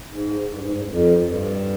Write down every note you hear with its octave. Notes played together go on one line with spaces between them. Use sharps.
G#2
G2
G#2
G2
F2
G2